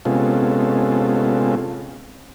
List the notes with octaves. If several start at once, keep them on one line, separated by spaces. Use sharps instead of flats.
C3 G#3 B3 C#4 F4 A4